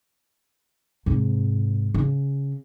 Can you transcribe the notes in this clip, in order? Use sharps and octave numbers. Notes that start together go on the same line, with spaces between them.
G#2 C3
C#3